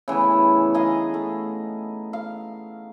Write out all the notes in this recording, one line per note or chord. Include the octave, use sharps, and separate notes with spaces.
C#3 E3 A3 B3
D#4 G#4 D#5 F5
A3
F5